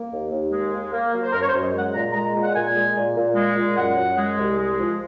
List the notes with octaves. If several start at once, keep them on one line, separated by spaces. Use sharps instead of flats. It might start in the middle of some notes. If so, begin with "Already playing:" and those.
Already playing: A#3
D#2
D#2
G#3
D#2
A#3
F#3
C5
F#2 A#4
C#5
C5
F#2
D#5
G#3 F#5
A#2 A#5
G#3 A#5
A#2
F#5
A#2 G#5
G#3
A#2
A#2
G#3
A#2
F#2 F#5
F#2
G#3
C2
G#3
F3